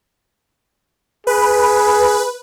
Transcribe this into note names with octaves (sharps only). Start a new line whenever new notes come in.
G#4 B4